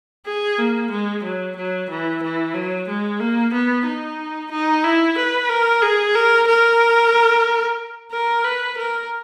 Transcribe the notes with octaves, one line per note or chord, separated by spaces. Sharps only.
G#4
A#3
G#3
F#3
F#3
E3
E3
F#3
G#3
A#3
B3
D#4
D#4
E4
B4
A#4
G#4
A#4
A#4
A#4
B4
A#4